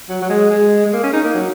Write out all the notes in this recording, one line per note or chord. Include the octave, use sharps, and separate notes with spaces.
F#3
F#3
G#3
G#3
G#3
A#3
C#4
D#4
A#3
F#3